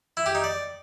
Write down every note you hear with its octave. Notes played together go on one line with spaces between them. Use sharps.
E4
G4
D#4
D5